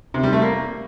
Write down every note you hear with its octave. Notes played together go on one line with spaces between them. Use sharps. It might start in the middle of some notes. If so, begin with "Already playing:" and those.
C3
G3
A3
A#3